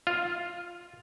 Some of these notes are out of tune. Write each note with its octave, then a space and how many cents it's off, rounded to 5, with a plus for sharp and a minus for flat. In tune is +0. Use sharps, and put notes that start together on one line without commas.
F4 +0 F5 -10